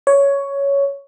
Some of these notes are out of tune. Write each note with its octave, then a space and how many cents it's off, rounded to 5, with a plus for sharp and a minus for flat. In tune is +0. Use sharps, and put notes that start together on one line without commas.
C#5 +10